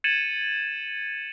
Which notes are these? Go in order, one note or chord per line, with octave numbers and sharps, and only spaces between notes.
G#6 A6 C#7 D#7 E7 F#7